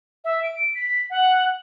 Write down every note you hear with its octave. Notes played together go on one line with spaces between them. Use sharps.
E5
D7
B6
F#5